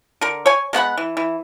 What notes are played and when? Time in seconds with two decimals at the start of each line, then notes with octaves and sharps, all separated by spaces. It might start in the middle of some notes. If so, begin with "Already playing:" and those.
0.21 D3 A#4
0.46 C#5 G#5
0.73 G#3 B3 F#5 B5
0.98 E3
1.17 E3